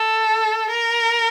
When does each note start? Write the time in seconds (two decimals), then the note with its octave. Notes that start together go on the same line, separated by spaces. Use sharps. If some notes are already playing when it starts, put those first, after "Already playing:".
Already playing: A4
0.70 A#4